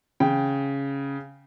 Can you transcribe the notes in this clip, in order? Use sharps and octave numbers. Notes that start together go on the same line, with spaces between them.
C#3 G5